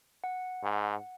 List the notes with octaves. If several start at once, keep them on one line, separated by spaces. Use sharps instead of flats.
F#5
G#2